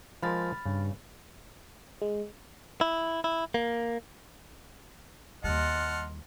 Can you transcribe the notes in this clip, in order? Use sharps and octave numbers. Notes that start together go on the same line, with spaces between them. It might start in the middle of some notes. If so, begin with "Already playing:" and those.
F3 G#3 A#4 B5 F6 A6
G2 C#3
G#3
E4
E4
A#3
D#2 G3 D#5 F#5 A5 C6 F6